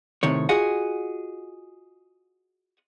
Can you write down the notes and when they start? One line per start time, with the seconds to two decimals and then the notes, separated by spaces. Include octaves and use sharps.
0.23 A2 C3 D#3 C#5
0.49 F4 F#4 G#4 D#5 F#5